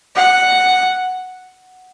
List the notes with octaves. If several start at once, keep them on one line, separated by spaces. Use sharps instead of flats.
F#5